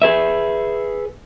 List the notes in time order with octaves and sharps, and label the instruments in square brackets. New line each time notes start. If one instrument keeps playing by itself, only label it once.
[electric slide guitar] G#4 B4 E5